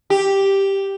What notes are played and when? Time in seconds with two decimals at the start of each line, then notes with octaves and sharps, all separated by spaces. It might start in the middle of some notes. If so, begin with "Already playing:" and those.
0.10 G4